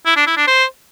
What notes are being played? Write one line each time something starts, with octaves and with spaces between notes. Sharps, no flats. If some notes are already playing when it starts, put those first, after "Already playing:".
E4
D4
E4
D4
C5